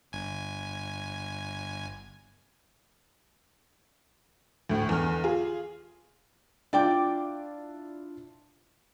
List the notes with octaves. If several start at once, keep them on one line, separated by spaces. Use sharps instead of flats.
G1 G#5
D2 A2
E2 D3 F6
F4 G#4
D4 E4 F4 D5 G5 D6